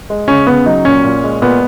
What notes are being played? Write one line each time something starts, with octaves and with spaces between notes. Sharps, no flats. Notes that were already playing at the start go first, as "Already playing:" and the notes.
G#3
C#3 C#4
C#3 B3
F#3 D#4
A#2 C#4
A#2
G#3
A#2 B3